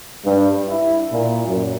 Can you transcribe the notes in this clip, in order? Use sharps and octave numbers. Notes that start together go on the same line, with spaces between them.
G2
E4
A#2
F#2